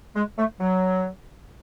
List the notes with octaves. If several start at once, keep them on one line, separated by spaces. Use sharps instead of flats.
G#3
A3
F#3